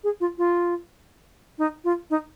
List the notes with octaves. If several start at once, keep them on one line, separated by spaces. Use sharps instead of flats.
G#4
F4
F4
D#4
F4
D#4